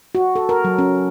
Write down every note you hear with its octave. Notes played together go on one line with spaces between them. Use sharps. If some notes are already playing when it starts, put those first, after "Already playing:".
F#4
A4
A#4
F#3
C#4